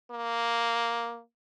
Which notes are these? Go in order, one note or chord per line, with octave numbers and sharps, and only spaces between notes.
A#3